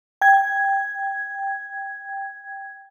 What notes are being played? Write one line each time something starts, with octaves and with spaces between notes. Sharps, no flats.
G5 G#6